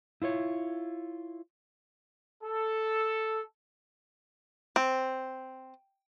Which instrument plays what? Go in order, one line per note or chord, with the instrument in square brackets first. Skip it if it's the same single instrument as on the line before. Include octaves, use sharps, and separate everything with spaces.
[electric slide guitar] E4 F4 C5 C#5
[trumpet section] A4
[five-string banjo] C4